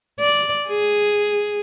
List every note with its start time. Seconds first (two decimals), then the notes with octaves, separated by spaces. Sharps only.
0.20 D5
0.68 G#4